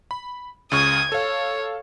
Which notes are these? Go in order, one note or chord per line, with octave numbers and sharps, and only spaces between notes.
B5
C#2 C#3 C#6 D#6 G#6
A4 C#5 F5